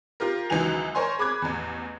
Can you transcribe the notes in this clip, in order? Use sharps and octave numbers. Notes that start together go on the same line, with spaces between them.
F4 G4 A#4
C#2 D#3 E3 F#3 G#5 F7
A#4 C5 C#5 G#5 C6
G#4 B5 D6 F#6 G#6
A1 E2